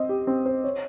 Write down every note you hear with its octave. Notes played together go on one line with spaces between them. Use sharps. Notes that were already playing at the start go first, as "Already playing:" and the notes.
Already playing: C4 C5 D#5
G4
C4
C5
C#5